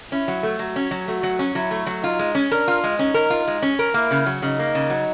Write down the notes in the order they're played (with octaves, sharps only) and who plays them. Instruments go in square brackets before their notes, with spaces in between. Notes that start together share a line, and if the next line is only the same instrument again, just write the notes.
[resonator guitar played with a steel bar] C#4 [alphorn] E4
[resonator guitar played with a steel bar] F#3
A3
[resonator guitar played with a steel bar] F#3 [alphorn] F#4
[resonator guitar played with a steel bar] C#4
F#3
[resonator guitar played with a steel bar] A3 [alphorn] F#4
[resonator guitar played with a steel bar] F#3
C#4
[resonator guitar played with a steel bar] F#3 [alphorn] E4
[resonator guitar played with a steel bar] A3
F#3
[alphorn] D#4 [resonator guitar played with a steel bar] F4
[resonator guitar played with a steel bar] G#3
C#4
[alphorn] D4 [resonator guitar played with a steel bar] A#4
[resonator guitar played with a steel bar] F4
G#3
[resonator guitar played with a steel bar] C#4 [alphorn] D#4
[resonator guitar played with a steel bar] A#4
F4
G#3
C#4
A#4
[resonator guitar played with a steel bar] A#3 [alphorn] E4
[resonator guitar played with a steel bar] C#3
F#3
[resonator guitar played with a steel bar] C#3 [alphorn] D#4
[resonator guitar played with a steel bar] A#3
C#3
F#3